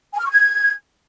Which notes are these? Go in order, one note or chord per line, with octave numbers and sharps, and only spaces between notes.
G#5
F6
C#6
G#6